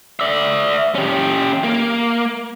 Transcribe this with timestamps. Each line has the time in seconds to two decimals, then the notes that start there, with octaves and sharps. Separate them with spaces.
0.20 D5 E5
0.95 C#4 G4
1.64 A#3